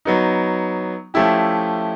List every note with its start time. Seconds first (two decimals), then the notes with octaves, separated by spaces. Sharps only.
0.05 F#3 B3 D#4
1.14 F3 A3 C#4 E4 G4